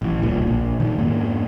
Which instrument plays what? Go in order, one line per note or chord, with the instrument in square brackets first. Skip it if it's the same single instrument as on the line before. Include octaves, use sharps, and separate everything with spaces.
[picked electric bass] A1 E3
D1 C2 A#2
A#1 A#2
A#2 D#3
F2 G#2 A#3